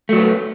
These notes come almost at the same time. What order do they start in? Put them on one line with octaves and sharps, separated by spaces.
A3 F#3 B3